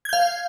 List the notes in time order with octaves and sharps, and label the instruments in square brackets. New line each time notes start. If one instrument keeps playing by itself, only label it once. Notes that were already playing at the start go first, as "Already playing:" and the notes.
[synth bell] G#6
G6
F5